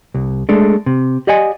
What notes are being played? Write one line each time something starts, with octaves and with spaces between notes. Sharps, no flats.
C2
G#3 A3 D4
C3
G4 D5 D#5 F#5 G#5